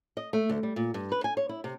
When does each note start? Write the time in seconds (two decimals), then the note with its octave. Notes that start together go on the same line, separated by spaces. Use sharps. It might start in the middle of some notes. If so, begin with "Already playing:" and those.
0.17 D#5
0.33 A3
0.50 D2
0.63 G3
0.76 A#2
0.94 G2
1.12 B4
1.24 G#5
1.37 C#5
1.49 E4
1.64 C3